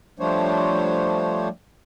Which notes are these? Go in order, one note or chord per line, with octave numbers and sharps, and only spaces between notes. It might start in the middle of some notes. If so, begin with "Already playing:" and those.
F3 G3 A3 D4 C5 C#5